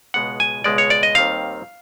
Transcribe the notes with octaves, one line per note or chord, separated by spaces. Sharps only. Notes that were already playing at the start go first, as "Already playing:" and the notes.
C#2 B2 G#3 B3 F#5
G#5
C#2 B2 G#3 B3 D5
C#5
D5
D#5
D#2 D#3 G3 C4 F5